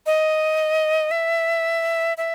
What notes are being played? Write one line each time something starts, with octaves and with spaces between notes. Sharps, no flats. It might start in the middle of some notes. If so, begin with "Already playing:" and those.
D#5
E5
E5